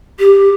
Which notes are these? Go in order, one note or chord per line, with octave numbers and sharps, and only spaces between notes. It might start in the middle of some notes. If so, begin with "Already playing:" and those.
G4